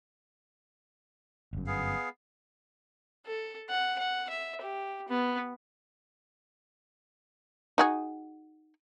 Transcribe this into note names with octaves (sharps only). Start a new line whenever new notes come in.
G1 F#2
B3 G#4 F5
A4
F#5
F#5
E5
G4
B3
D#4 F#4 G#4